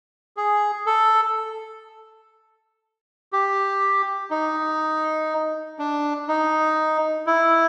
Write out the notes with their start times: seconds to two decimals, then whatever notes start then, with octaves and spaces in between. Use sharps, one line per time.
0.37 G#4
0.86 A4
3.33 G4
4.30 D#4
5.79 D4
6.28 D#4
7.27 E4